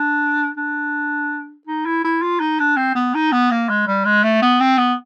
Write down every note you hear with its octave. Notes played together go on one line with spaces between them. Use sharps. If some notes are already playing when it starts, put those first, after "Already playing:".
Already playing: D4
D4
D#4
E4
E4
F4
D#4
D4
C4
B3
D#4
B3
A#3
G#3
G3
G#3
A3
B3
C4
B3